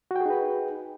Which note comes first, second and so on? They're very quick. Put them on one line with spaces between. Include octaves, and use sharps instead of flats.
F#4 G5 G#4 D#4 B4